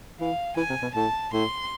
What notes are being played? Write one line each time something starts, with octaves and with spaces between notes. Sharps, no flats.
E3 F5
E3 G#5
C3
B2
A2 A5
A2 C6